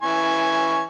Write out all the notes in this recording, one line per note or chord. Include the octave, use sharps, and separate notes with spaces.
E3 G#5 C#6